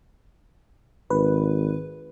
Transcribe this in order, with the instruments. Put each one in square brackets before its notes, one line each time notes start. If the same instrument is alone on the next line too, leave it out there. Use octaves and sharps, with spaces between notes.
[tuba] G#1 [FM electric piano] B4